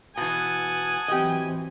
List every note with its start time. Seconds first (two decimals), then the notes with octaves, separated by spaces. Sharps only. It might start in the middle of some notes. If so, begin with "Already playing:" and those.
0.17 B2 E3 F#5 G#5 A5 D#6
1.08 E3 F#3 C4 G4 D#5